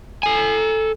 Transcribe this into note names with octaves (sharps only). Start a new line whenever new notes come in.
A4 G#5